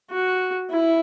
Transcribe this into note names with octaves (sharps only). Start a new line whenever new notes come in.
F#4
E4